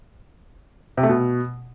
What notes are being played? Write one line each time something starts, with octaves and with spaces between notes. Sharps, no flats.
C3
A3
B2